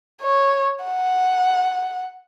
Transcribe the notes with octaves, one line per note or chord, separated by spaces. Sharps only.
C#5
F#5